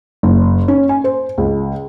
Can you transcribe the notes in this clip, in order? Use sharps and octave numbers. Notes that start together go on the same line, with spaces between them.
F#1
C#4
G#5
C5
C#2